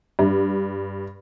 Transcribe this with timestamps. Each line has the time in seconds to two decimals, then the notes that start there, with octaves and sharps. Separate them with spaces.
0.19 G2